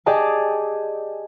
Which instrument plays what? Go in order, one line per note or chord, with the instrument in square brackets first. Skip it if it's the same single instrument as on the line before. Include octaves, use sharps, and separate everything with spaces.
[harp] G4 G#4 D5 D#5 A5